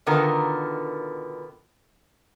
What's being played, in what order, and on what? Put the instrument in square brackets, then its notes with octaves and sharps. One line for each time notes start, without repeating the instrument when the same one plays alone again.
[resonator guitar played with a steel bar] B2 D3 D#3 B3 F4 A#4